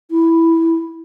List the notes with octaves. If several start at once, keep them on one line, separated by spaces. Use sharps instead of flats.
E4